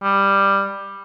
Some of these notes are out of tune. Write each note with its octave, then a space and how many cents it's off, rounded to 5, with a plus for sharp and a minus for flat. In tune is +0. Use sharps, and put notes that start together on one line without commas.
G3 +10